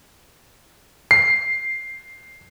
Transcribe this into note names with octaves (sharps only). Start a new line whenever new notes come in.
C7